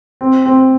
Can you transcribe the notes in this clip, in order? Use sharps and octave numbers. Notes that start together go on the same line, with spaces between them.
C4
C4